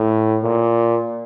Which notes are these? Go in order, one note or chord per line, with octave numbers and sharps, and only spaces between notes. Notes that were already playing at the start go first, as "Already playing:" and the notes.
Already playing: A2
A#2